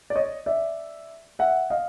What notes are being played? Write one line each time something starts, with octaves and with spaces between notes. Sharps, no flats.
D5
C#5 D#5
D5 E5
E5 F#5
D#5 F5